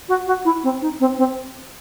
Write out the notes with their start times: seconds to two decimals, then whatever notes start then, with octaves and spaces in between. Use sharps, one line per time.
0.09 F#4
0.27 F#4
0.45 E4
0.64 C4
0.82 D#4
1.00 C4
1.18 C4